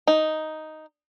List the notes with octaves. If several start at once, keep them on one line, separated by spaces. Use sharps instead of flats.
D#4